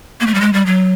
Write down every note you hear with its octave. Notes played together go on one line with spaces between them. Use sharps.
A#3
A3
G3
G#3
G3
F#3